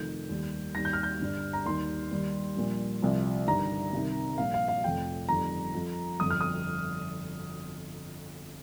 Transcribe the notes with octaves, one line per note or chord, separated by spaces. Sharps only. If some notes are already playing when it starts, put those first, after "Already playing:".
Already playing: F1 F2 D#3 G6
D#2 D#3 G3
D#2 D#3 G3 A#6
G6
F6
G6
G1 G2 G3
A#5
D#2 D#3 G3 C6
D#2 D#3 G3
A#1 A#2 G3
C2 C3 F3
G1 G2 D#3 G3 A#5
C2 C3 D#3
A#1 A#2 G3 F5
F5
F5
F1 F2 F3 G5
G1 F2 D#3 G3 A#5
F2 F3
G1 F2 F3 D#6
F6
D#6